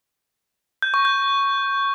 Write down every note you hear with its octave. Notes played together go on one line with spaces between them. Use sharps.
G6
C#6
G6